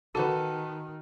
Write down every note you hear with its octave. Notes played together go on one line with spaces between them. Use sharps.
D#3 F#4 A4 B4 F#5